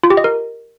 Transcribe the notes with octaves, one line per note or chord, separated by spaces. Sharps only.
F4
G4
D#5
A#4